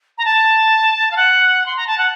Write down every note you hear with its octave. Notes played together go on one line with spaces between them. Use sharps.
A#5
A5
F5
F#5
C6
A#5
A5
F#5